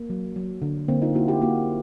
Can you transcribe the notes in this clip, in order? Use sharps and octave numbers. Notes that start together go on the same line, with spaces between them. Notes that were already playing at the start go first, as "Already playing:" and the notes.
Already playing: A#3
F#3
F#3
D3
D3 A#3 C4
D#4 F4
A#3 E4 F#4
F4 G4
A#3 E4 F#4